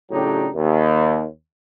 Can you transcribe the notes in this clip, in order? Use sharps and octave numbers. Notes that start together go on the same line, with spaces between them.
A2 C#3 F#3 D4 D#4 G4
D#2